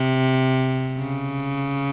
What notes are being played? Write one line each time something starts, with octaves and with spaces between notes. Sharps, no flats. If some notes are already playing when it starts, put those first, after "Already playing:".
Already playing: C3
C#3